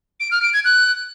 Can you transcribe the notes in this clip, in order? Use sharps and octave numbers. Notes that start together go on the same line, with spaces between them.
D7
F6
D7
G#6
F#6